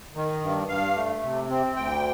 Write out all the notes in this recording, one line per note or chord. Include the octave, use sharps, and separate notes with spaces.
D#3
G2
G2 F5
A3
C3
C4
D2 G5